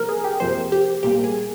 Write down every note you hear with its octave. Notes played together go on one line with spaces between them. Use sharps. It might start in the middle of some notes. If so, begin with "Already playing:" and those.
Already playing: C3 F3 A#3 A#4
G#4
G4
F2 C3 F3 A#3 C5
G4
A#1 A#2 G3 A#3 G4
G#4